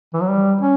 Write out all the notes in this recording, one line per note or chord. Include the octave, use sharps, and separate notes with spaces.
E3
F#3
G3
C#4